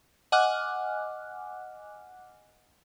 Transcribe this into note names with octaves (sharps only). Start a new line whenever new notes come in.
D#5 F#5 G#5 D6 F6 F#6